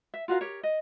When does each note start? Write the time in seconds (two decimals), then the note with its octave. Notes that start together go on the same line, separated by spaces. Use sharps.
0.14 E5
0.28 F4 F#4 A#4 F5
0.41 G4 A#4 C#5
0.63 D#5